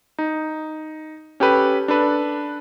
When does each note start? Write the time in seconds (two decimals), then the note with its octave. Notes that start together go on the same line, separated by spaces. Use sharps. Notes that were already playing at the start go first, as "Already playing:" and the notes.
0.19 D#4
1.40 C#4 G4 A4 B4
1.88 D4 A4 B4